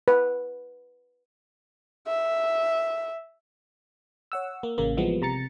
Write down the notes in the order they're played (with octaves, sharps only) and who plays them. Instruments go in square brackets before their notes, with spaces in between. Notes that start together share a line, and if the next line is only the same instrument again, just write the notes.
[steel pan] B4
[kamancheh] E5
[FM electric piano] C#5 F#5 E6
A#3
A1 C#3 A#3
E3 F3 G3 G#3 B3
C3 A#5 A6 C#7